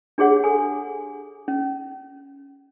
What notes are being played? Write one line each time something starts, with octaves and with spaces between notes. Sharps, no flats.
D4 G4 G#4 C#5 F#5
A4 G#5
C#4